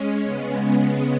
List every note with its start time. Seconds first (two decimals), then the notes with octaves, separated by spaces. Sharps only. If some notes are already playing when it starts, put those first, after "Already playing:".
Already playing: G#3 C#4
0.23 C#3 G#3 B3